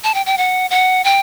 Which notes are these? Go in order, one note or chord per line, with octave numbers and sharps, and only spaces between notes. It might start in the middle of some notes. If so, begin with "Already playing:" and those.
A5
G5
G5
F#5
F#5
G5